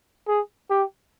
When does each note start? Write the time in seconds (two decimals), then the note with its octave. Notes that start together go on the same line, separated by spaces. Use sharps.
0.28 G#4
0.70 G4